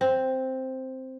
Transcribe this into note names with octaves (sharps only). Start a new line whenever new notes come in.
C4